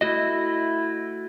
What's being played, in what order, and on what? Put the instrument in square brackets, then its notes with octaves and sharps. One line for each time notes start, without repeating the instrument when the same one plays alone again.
[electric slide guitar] A3 F#4 D#5 [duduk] E4